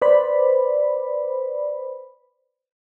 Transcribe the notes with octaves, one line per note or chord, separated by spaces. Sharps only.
B4 C5 D5 B5